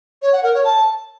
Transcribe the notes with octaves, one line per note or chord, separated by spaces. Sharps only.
C#5
F#5
A#4
C#5
A5